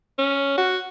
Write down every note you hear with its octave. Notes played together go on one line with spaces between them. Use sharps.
C#4
F#4